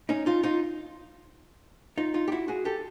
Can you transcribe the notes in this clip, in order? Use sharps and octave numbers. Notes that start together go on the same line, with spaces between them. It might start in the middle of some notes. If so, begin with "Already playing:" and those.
C#4 D#4
D#4 F4
D#4 F4
D#4 F4
D#4 F4
G4
E4 F#4
F#4 G#4
G4 A4